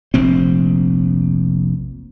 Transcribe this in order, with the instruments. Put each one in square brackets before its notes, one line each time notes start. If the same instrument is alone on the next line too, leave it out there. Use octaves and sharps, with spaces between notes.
[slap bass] F1 A#1 C4